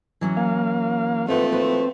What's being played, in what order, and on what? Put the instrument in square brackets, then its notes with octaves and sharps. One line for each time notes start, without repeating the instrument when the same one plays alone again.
[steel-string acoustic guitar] E3 F#3 C#4
[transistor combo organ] A#3 F5
[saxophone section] D#2 F3 A3 [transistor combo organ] C4 [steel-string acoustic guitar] B4 C5 F#5
[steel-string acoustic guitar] F#4 B4